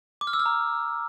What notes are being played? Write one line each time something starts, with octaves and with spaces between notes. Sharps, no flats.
D6
F6
E6
F6
A#5